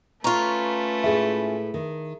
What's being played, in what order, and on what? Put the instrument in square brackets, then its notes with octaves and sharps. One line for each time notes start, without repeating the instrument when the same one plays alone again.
[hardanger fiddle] A3 B4 [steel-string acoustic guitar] C#4 F4 [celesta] A#5 C#6
[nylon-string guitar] A2 G#3 E4 [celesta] G#4 E5
[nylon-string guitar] D#3